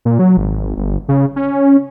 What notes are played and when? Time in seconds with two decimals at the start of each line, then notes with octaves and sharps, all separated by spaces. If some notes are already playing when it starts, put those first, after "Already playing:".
0.05 A#2
0.19 F#3
0.37 G#1
0.77 G1
1.09 C#3
1.36 C#4